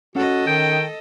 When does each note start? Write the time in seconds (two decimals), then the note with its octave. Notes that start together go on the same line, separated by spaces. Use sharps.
0.16 C#4 F#4 A4 C#5 D#5 F#5
0.47 D#3 G5